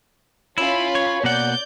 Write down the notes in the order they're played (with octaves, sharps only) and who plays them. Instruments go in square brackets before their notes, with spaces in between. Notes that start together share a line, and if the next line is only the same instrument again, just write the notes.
[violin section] C#4 F4 B5 [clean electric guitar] E4
[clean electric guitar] C#5
[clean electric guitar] B2 A#3 F#5 [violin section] D5 G6